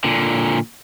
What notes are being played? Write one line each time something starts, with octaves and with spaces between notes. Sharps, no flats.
A#2 D3